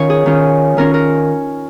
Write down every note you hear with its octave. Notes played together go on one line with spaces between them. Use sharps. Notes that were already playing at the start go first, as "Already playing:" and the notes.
Already playing: D#3 C#4 F4 A#4 C#5 F5
G#4
D#3 C#4 F4
D#3 C#4 F4 A#4
A#4